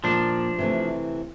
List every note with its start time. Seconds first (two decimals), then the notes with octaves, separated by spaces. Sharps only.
0.04 A#2 F3 A#3 D4
0.58 C3 E3 A3